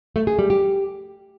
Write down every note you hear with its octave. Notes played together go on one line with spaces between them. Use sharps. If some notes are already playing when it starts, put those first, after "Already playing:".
A3
G#4
G3
G4